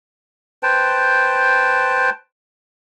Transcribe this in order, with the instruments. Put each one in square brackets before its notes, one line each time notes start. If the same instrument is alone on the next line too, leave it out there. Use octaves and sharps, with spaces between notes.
[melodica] B4 C5 G5 A5